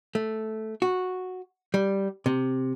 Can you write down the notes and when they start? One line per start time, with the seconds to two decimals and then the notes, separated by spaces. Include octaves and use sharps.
0.15 A3
0.82 F#4
1.74 G3
2.26 C3